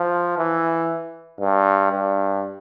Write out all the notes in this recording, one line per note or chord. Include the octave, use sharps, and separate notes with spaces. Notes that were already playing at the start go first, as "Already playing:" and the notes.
Already playing: F3
E3
G2
G2